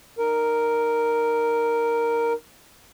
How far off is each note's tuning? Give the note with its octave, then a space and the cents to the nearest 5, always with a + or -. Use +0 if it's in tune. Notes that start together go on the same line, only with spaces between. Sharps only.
D#4 -25 A#4 +0